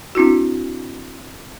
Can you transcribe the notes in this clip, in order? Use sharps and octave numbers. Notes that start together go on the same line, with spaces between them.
C4 D4 E4 F#4